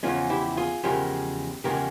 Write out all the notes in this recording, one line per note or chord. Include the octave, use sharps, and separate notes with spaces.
E2 C#3 F3 G#3 C#4 F4
E4 G4
F4 G#4
E2 C#3 F3 G#3 G4 A#4
E2 C#3 F3 G#3 G4 A#4